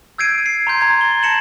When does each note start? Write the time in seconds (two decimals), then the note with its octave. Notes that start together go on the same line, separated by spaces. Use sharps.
0.18 E6 G6 G#6 C7 D7 D#7
0.46 C7
0.67 A#5 C6 G6 G#6
0.81 A#5 G#6
1.01 A6 G7
1.23 A5 A#6 C#7 E7 F#7